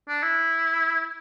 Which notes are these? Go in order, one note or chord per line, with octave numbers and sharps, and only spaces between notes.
D4
E4